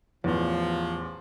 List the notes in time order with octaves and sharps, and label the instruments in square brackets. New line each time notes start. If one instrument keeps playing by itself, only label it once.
[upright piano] A1 E2 [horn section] F3